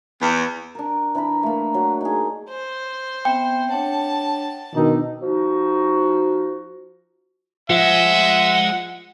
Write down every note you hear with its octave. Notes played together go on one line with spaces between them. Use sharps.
E2
D4 A#4
E3 D4 A#4 B5
A3 A#3
F#3
D#4 G#4
C5
B3 C4 E5 G5
D4 C#5 F#5 A5
B2 D#3 D4 D#4 E6
F3 D#4 F#4
F3 G#3 E5 F#5